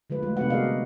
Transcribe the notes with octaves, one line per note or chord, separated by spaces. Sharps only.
D3 F3 G#3 B4
F#3 G3 A3 F4
C3 B3 D4 F#4 B4 F#5
F#4 G#4 A#4 D5 D#5 F5
F#4